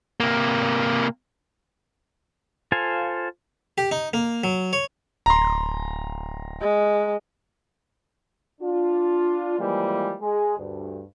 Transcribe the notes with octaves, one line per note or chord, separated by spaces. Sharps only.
C3 A#3
F4 A4 C5 F5 G#5
G4
D#4
A#3
F#3
C#5
D1 A#5 C6
G#3
D4 F4
E3 F3 G3 G#3 A#3
G#3 G#4
D2 G2